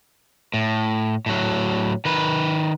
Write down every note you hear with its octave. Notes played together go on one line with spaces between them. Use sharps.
A2
A2 F#3
D#3 B4